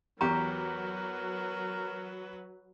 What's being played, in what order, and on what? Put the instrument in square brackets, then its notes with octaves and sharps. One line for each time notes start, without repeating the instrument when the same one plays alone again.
[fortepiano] E2 G4 C#6 [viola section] F#3 B4 [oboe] A#4 [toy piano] A#5